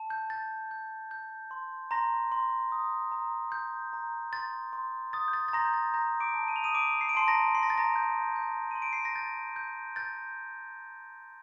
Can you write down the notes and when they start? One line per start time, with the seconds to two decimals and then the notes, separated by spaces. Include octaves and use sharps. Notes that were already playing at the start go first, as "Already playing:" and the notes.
Already playing: A5
0.10 G6
0.30 G6 A6
0.71 G6
1.11 G6
1.51 C6
1.91 A#5 C6 A#6
2.32 C6
2.72 D#6
3.12 A#5
3.52 G6
3.93 A#5
4.32 C6 A6
4.73 C6
5.13 D#6 A6
5.28 G6
5.33 A6
5.48 A6
5.53 A#5 C6 A#6
5.65 G6
5.74 A6
5.94 A#5 G6 A#6
6.20 D6 D7
6.34 A5
6.48 D#7
6.56 F7
6.64 D#6 D#7
6.75 D6 D7
7.01 C7
7.09 D7
7.15 A5 C6 C7
7.28 A#5 A#6
7.54 C6 C7
7.63 A#6
7.70 A6
7.78 A#5 A#6
7.96 G6
8.36 G6
8.71 C6 D#7
8.82 D7
8.93 C7
9.05 A#6
9.15 G6 A6
9.56 G6
9.96 G6 A6